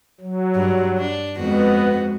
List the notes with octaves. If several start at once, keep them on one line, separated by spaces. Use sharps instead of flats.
F#3
G2 G3
D4
F2 G#3 B3 F#4